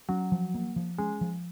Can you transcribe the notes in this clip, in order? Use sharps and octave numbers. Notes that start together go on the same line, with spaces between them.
F#3 C#4
F3
A#3
F3
G#3 C#4
F3